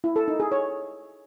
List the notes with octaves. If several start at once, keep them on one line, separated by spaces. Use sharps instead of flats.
E4
A4
D#4
G#4
C#5